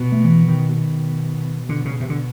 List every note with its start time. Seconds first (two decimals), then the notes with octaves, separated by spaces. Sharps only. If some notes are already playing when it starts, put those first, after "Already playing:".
Already playing: B2
0.12 A3
0.24 E3
0.48 D#3
0.72 B2
1.69 B2 D3
1.85 C#3
2.00 C3
2.10 D3